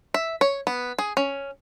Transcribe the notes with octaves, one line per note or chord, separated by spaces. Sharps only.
E5
C#5
B3
G#4
C#4